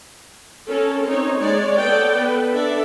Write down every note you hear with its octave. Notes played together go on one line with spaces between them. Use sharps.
C#4 A4 A#4
C4 D#4 C#5
G#3 C#5 D5
B3 A4 D5 G5
A4 B4
D4 A4 D5 E5